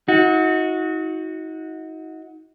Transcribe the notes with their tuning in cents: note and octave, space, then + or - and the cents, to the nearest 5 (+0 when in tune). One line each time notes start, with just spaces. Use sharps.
D#4 +35 F#4 -15